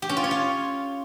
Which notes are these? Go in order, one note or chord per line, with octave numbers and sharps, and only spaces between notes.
G4
C#4
F4
C#5
F4